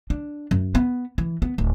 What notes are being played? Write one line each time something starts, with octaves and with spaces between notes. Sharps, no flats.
D4
F#2
B3
E3
B3
D1